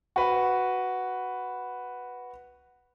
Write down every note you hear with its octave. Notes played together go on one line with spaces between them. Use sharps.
F#4 B4